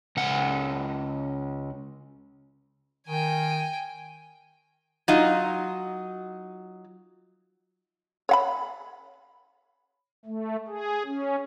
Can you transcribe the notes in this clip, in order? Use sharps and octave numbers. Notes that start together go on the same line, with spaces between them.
C#2 F#5
D#3 G5 G#5
F#3 D#4 F4
C#5 F#5 B5
A3
G#4
C#4